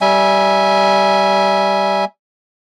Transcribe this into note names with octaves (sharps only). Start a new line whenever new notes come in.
G3 E5 G#5